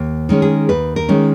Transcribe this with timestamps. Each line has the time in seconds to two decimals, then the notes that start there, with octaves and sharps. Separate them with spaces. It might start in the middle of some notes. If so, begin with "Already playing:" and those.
Already playing: D#2
0.29 D#3 G#3 C#4
0.42 G#4
0.69 D#2 B4
0.96 A#4
1.09 D#3 G#3 C#4